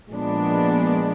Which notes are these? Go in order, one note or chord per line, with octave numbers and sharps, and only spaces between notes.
A#2 F3 G#3 B3 D4